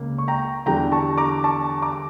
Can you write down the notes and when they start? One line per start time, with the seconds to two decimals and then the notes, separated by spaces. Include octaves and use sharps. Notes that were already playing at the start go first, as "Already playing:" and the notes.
Already playing: C#2 C#3 A#3
0.18 C#6
0.28 G5 A#5
0.66 E2 D3 G3 G5 A#5
0.92 A5 C#6
1.18 A#5 D6
1.44 A5 C#6
1.82 A#5 D6